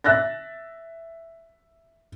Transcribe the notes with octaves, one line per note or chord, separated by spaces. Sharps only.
E5 F#6 A6 A#6